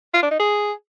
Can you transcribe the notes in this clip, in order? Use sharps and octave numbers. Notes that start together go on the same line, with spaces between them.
F4
D4
D#4
G#4